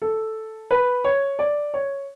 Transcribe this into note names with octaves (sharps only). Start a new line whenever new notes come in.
A4
B4
C#5
D5
C#5